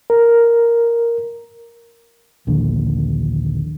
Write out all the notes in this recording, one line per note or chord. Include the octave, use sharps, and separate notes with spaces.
A#4
A#1 D#2 D3